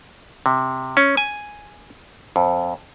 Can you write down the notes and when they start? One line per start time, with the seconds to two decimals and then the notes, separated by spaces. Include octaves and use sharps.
0.46 C3
0.97 C#4
1.17 G#5
2.36 F2